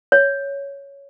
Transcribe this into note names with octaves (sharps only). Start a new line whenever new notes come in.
C#5